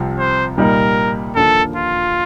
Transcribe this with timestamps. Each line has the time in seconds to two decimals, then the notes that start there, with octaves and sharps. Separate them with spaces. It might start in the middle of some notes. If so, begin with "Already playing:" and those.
Already playing: C2 C3 F3 C4
0.18 C5
0.58 C2 A#2 G3 A#3 D#4 A#4
1.35 D#2 D3 F3 A#3 A4
1.76 F4